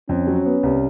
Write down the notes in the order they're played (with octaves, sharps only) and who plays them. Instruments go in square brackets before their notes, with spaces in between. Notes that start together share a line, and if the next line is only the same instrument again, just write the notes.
[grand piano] F2 [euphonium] C#4
[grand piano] F#3
B3
C2